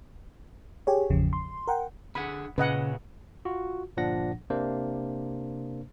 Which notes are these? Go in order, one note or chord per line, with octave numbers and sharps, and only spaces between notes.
G4 G#4 C#5
G#1 E2 C#3 F3
C6
A#4 F#5 G5
D3 G#4 F#5 B5
A#2 C#3 B4 D#5 F#5
F4 F#4
G1 A#2 F3 D4 F#5 A#6
C3 A#3 D4 C5